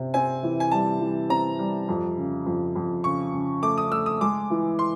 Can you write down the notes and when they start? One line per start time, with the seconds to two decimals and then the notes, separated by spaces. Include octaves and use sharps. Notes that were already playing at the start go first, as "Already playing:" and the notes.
Already playing: C3 C4
0.14 C4 G#5
0.43 E3
0.60 G#5
0.71 G3 A5
1.00 E3
1.30 C4 A#5
1.59 G3
1.89 F2
2.17 C#3
2.46 F2
2.76 F2
3.04 C#3 C#6
3.33 C#3
3.62 A3 D6
3.78 D#6
3.91 A3 E6
4.06 D#6
4.21 G#3 D6
4.50 E3
4.79 C6